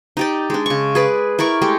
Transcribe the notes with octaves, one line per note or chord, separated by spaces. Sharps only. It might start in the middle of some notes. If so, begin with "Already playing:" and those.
D#4 G4 D5
G#3 D4
C#3 C#6
G#4 B4 D5
E4 A#4 D5 C#6
G#3 A3 G4